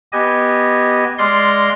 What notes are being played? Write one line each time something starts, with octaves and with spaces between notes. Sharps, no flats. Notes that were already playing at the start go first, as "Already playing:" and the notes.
B3 G4 D#5 G#5
G#3 D5 F5 C6 A#6